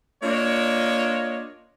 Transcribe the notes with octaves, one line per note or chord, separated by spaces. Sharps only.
A#3 D4 F4 C#5 D#5